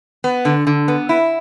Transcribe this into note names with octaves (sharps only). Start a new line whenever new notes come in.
B3
D3
D3
B3
E4